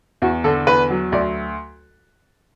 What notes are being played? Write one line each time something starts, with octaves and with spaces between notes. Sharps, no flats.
E2 F#4
D3 A4
E2 B4
F#3
D2 D5